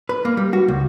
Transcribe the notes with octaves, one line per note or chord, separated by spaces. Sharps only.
B4
A#3
G3
F#4
C#2